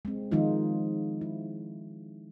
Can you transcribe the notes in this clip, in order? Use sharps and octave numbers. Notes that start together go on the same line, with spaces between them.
G#3 C4
D#3 F3 G#3 D#4 F4
E4